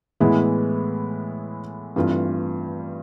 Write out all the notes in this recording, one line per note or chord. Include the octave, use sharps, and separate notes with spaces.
A2 E3 G#3 B3 E4
G2 E3 A3 C4 F4